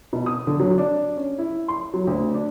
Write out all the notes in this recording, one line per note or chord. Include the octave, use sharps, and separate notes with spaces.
B2
D#6
D3
F#3
D4
C#4
E4
C6
F#3
D2
D4